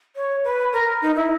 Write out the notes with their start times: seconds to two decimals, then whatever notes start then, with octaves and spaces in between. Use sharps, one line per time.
0.16 C#5
0.44 B4
0.73 A#4
1.01 D#4
1.15 E4